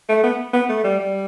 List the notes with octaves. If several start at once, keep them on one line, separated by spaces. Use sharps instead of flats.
A3
B3
B3
A3
G3
G3